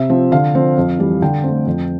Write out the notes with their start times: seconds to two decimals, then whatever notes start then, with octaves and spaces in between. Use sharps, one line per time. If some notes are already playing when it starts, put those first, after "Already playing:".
Already playing: C3 E5
0.09 F3 C4
0.31 D3 F5
0.55 F3 C4
0.77 F2
0.99 E3 G3
1.22 D3 G5
1.44 A3 C4
1.67 F2